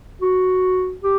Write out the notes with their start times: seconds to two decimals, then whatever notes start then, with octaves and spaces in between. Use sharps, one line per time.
0.22 F#4
1.03 G4